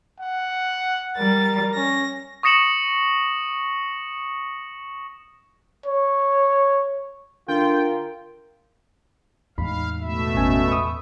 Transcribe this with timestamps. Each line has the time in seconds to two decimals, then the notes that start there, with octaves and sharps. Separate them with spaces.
0.20 F#5
1.17 G3 A#4 A6
1.75 C#4 A#6
2.43 C#6 D#6 A#6 C#7 E7 F#7
5.86 C#5
7.48 D3 F4 A#4 G5
9.58 E2 A2 G#3 D#4 F5 B5
10.01 B2 A3 E5
10.35 G#1 C#4 G#5
10.68 B5 C#6 D#6